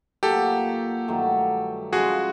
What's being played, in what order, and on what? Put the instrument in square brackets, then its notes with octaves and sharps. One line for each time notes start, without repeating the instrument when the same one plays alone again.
[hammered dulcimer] A#2 F#3 A#3 [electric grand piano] G4 A4
[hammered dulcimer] G2 D#3 F#3 A3
[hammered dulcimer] C#3 F3 G#3 [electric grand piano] F#4 G#4